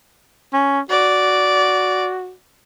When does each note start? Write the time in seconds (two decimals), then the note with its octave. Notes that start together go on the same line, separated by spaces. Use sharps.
0.53 C#4
0.90 F#4 D5